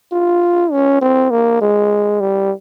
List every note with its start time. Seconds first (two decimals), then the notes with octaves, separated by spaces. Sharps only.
0.12 F4
0.72 C#4
1.01 C4
1.31 A#3
1.61 G#3
2.21 G3